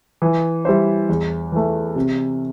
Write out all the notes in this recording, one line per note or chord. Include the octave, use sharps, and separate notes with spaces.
E3
G3 E4 C5
E2
E3 A3
C3